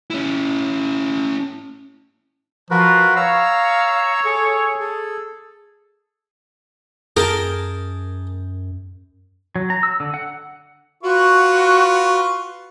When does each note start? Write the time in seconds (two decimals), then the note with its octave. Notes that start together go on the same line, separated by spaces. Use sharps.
0.10 C#4 E4
2.71 F3 F4 F#4 A#4 B4
3.16 C#5 F5 A#5 E6
4.25 G#4 A4
4.80 G#4 A4
7.17 F#2 G#4 A#4 G5 A5
9.56 F#3
9.70 A#5
9.83 E6
10.00 D3
10.14 F#5
11.03 F4 F#4 B4 C#6